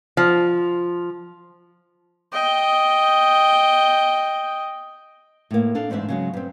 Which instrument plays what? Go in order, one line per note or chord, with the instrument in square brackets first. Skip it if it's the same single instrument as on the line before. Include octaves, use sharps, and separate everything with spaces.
[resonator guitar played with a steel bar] F3
[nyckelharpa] D#5 G5
[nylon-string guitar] A2 A#3
D4 A4 F5
E2 G#2 C4 D4 E5
C#3 F#3 G#3
G2 C4